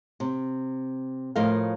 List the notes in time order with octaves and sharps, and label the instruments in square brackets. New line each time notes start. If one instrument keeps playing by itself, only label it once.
[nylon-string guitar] C3
A2 F3 A#4 D#5 F5